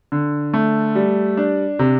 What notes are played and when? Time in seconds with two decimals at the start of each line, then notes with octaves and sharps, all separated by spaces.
0.12 D3
0.54 A3
0.95 G3
1.37 D4
1.79 C3